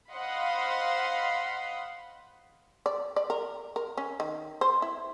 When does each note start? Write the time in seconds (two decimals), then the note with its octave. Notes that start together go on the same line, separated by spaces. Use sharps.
0.11 C5 D#5 F5 F#5 B5 C6
2.86 D5
3.16 D5
3.30 A#4
3.76 A#4
3.97 C#4
4.20 D#3
4.61 C5
4.82 E4